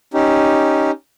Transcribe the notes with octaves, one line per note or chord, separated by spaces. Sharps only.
C#4 D#4 G4